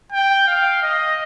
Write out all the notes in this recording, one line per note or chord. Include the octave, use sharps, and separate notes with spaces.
G5
F5
D#5